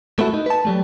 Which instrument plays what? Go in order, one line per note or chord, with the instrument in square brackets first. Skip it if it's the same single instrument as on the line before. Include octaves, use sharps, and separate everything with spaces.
[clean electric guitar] A3 B3 E4 F#4 A4
D#4
B4 A5
F#3 G3 A3